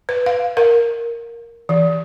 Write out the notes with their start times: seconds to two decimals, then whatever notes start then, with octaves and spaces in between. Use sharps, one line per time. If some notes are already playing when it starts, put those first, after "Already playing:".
0.09 B4
0.26 F5
0.57 A#4
1.69 E3